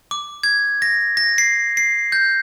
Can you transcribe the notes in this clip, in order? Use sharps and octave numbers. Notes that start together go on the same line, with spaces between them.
D6
G#6
A#6
A#6
C7
C7
G6